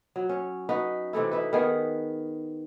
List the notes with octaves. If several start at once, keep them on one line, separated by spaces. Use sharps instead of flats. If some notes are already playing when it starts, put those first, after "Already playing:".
F#3
C#4
D#4 F#4 B4
C3 E3 A3 E4
D#4 E4 B4
D#3 B3 G#4 B4